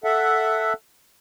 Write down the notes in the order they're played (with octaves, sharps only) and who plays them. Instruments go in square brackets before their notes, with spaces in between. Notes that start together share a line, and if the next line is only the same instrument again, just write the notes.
[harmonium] A4 E5 F#5